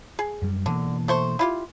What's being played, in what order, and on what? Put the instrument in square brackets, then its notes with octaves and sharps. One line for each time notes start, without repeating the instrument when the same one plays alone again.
[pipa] G#4
[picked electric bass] F#2 G3
[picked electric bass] B2 E3 A#3 [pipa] D3
[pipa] A3 C5 C#6
E4 F4 G4